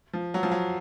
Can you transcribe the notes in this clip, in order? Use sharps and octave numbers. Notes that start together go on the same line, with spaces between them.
F3
F#3
F3
F#3